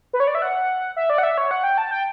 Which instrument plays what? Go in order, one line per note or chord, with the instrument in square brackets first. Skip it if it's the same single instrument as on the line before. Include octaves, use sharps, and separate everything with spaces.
[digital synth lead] B4
C#5
D5
E5
F#5
E5
D5
F#5
E5
C#5
F#5
G5
A5
G5